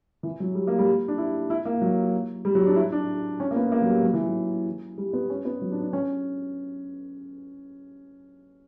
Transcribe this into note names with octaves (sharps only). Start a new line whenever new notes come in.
E3
F#3
G3
A#3
G3
D4
E4
E4
A#3
F#3
G3
F#3
D4
E4
D4
C#4
A#3
B3
A#3
F#3
G3
F#3
E3
F#3
G3
B3
C#4
B3
F#3
D4
D4
C#4